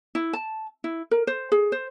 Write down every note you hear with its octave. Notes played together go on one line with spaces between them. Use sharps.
E4
A5
E4
A#4
C5
G#4
C5